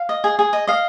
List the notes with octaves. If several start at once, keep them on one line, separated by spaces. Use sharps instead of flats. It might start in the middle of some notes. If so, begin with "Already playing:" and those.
Already playing: F5
D#5
G#4
G#4
D#5
D#5 F5